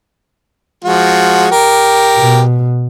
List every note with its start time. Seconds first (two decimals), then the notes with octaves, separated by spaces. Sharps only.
0.84 F3 G#3 F#4
1.52 G4 A#4
2.17 B2